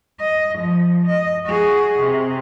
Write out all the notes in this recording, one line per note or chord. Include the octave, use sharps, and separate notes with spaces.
D#5
F3
D#5
F#4 G#4
C3